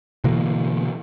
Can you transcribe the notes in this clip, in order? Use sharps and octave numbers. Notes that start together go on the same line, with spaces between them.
B2 D3 E3 A#3